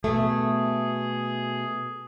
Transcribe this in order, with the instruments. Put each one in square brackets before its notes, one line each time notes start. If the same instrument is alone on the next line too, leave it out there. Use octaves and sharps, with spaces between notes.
[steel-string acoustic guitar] B2 A3 [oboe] G#4